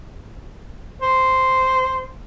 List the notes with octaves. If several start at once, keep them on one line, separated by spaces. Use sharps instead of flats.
C5